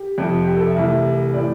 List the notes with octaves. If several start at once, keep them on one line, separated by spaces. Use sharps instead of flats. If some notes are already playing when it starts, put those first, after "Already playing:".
Already playing: G4
F2 C3 F3
G4
A4
E5
C2 C3 E3 A3
A2 E3 D5